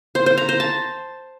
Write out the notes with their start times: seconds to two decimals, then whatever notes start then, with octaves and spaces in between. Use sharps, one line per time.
0.15 C5
0.26 C5
0.37 A#5
0.49 C5
0.60 A5